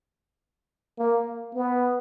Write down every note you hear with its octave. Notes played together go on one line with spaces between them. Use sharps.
A#3
B3